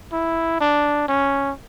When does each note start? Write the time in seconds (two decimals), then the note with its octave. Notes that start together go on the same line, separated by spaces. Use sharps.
0.13 E4
0.61 D4
1.08 C#4